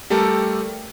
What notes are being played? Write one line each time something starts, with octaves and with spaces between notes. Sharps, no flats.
G3 A3 G4 A4 A#4